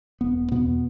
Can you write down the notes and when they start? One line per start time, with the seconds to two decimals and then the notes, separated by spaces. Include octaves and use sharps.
0.21 E1 B3
0.51 E2 B2 B3